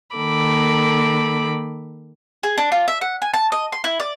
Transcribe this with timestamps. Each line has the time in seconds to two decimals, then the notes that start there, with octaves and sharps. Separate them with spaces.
0.16 D#3 A#3 A4 B5 D6
2.43 G#4
2.58 D4
2.72 F4
2.88 E5
3.01 F#5
3.22 G#5
3.34 A5
3.52 D#5
3.72 C6
3.84 E4
4.00 D5